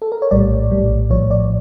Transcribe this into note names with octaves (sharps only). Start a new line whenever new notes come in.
A4
A#4
C#5
A#1 A2 G3 D5
A#1 A2 G3
A#1 A2 F3 C#5
D5